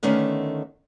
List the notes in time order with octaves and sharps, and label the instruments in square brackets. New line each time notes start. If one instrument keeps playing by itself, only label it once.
[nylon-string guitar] D3 D#3 A3 B3 C#4